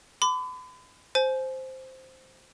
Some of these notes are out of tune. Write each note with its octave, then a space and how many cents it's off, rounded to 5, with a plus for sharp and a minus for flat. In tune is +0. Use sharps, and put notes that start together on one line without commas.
B5 +40 D6 +0
C5 +0 G#5 +35